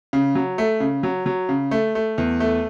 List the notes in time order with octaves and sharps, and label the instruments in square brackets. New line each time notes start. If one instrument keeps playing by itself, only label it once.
[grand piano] C#3
F#3
A3
C#3
F#3
F#3
C#3
A3
A3
E2
A3